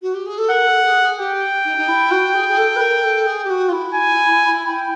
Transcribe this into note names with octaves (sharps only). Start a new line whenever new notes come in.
F#4
G4
G#4
A4
A#4 F#5
A4
G#4
G#4
G4 G5
D#4
D#4
E4
F#4
G#4
G#4
A4
B4
A#4
A4
G#4
G4
F#4
F4
E4
G#5
G5